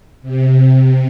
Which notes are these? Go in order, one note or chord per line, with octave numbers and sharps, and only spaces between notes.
C3